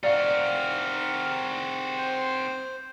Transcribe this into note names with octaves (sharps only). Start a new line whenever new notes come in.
C4 F#4 D5 F5 A#5 F6
C5